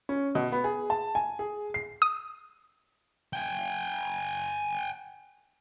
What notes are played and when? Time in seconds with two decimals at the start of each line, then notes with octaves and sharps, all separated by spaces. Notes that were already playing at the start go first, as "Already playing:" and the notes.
0.09 C#4
0.35 B2
0.52 B3
0.64 G#4
0.90 A5
1.15 G#5
1.39 G#4
1.74 C7
2.02 D#6
3.33 G5 G#5